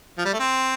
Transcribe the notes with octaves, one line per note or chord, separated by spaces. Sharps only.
F3
G3
A3
C4